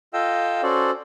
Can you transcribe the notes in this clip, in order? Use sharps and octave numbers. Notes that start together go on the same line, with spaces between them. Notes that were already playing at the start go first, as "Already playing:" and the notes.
F4 A4 D#5 F5 G5 E6
C#4 F#4 A4 C5 D5